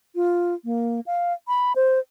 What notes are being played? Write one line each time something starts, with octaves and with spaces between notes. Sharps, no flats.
F4
A#3
F5
B5
C5